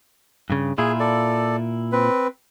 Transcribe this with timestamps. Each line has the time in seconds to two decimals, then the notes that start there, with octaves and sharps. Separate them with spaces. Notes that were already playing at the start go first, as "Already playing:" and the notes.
0.50 G2 C#3
0.78 A#2 E4 F4 G#4
1.00 A4 D5
1.92 C4 B4